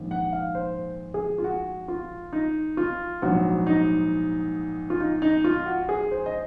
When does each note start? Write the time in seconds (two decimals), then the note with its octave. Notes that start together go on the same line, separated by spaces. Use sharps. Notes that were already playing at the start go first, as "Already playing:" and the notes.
Already playing: A#1 G#2 D#3
0.11 F#5
0.33 F5
0.55 C5
1.14 G#4
1.38 F4
1.44 F#4
1.88 F4
2.33 D#4
2.77 F4
3.22 A#1 G#2 F#3 F#4
3.67 D#4
4.90 F4
5.00 D#4
5.22 D#4
5.44 F4
5.66 F#4
5.89 G#4
6.11 C5
6.26 D#5